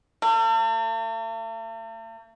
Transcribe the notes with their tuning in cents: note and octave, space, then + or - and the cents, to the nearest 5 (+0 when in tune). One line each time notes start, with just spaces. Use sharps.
A3 +45